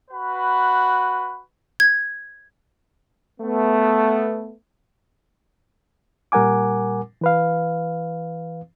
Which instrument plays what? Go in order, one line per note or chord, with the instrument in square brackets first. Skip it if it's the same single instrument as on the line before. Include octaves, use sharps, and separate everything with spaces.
[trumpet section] F#4 B4
[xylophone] G#6
[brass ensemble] A3 B3
[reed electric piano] A#2 G3 A#4 F#5 G#5 D6
E3 B4 F5